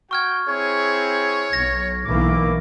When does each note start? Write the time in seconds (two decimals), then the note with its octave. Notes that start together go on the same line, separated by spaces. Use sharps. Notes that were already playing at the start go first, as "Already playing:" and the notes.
0.11 F#4 G5 C#6 F6 G#6
0.48 C4 E4 G#4 C#5
1.53 B1 A#6
2.05 B1 E3 A#3 E4 D6